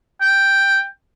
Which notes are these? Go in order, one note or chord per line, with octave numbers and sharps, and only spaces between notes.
G5